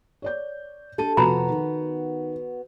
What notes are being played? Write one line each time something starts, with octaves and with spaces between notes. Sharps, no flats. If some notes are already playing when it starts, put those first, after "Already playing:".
C#5 D5 G6
D4 G4 A4 D#7
F1 F3 B3 F#4 A#5 B5
D#3